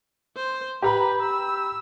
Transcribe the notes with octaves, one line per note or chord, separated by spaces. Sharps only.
C5
G4 B4 A#5 B5
E6